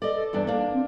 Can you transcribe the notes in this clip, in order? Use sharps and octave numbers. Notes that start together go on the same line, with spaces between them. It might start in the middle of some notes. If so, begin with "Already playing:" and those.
A4 D5 D#5
A4
E2 G2 D4
A#3 D4
C4